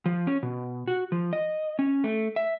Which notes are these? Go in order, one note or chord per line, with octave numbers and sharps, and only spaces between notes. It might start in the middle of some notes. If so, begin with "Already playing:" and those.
F3
C#4
B2
F#4
F3
D#5
C#4
A3
E5